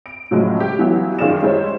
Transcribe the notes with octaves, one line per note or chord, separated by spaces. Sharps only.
D7
A2 C#3 F3 F#3 G#3
G4
E3 F#3 G3 B3 E4 F4
F#2 D#3 F4 G#4 D5 E7
G3 G#3 E4 C5 C#5